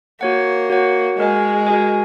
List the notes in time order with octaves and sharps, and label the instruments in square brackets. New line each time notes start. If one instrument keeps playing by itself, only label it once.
[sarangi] A#3 [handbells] F#4 C#5 F#5
[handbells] F#4 C#5 F#5
[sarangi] G#3 [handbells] F#4 A#4 D#5 G#5
[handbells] F#4 A#4 D#5 G#5